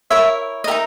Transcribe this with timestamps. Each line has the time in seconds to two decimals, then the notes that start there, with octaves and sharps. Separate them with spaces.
0.10 E4 A#4 C#5 E5
0.64 D#5
0.67 D#4 G4 A#4 E5